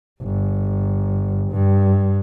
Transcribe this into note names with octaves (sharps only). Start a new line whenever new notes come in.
G1
G2